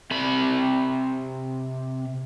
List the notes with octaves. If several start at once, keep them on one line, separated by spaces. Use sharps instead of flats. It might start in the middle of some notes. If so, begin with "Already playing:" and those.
C3 B5